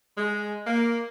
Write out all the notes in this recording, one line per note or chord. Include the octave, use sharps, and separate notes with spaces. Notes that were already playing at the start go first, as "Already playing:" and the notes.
G#3
A#3